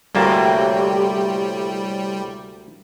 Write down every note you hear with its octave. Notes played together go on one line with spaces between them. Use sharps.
D2 A2 C3 G3 A#3 G4 A5